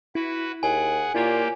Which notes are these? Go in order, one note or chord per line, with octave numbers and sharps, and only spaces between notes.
E4 F#4 B4
D#2 G#4 F#5 G#5
A#2 A#3 E4 F4 G4 C#5